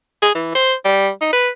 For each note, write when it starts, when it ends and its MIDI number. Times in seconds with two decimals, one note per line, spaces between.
0.22 0.32 68
0.35 0.52 52
0.55 0.73 72
0.85 1.10 55
1.21 1.28 63
1.33 1.49 71